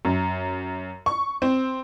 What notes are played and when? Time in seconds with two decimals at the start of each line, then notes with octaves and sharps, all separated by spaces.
0.05 F#2
1.06 C#6
1.42 C4